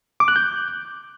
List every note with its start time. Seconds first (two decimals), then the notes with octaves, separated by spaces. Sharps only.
0.20 D6
0.28 F#6
0.36 G6